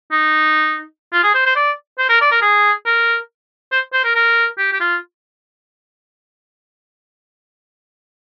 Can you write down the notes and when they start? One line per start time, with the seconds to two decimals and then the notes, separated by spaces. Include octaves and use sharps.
0.12 D#4
1.13 F4
1.23 G#4
1.34 C5
1.46 C5
1.56 D5
1.99 C5
2.09 A#4
2.21 D5
2.31 A#4
2.42 G#4
2.86 A#4
3.72 C5
3.93 C5
4.04 A#4
4.15 A#4
4.58 G4
4.73 G4
4.80 F4